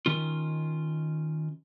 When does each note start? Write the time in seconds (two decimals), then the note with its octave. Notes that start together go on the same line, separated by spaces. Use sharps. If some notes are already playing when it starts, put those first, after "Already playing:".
0.06 D#3 C#4 F4